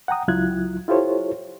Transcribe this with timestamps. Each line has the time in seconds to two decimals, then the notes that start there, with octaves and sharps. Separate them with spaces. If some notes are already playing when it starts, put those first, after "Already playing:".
0.08 F#5 G5 A#5 D#6
0.28 C#2 F#3 E4 F4 F#6 G#6
0.88 E4 F4 G4 A4 C5 C#5